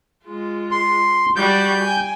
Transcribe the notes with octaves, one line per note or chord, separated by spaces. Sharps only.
G#3 F4
C6
G3 F#4 G6
G5 G#5